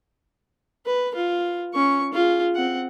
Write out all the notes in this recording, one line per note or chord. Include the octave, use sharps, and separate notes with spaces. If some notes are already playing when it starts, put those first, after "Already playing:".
B4
F4
C#4 C#6
F4 G#4
C4 F#5